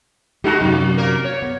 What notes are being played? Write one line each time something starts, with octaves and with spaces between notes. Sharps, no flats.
G#3 D#4 F#4 G4
F#2 C3 F#3 A#3
A#2 A#3 A#4
C#5
B3